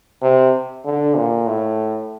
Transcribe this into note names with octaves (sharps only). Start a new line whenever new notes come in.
C3
D3
A#2
A2